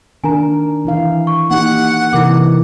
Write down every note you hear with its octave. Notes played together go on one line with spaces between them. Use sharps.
D#3 D4 A#4 G#5 A#5
E3 E4 F5
C#6
A#3 D#4 G4 F#5
C3 E3 E4 A#4 D6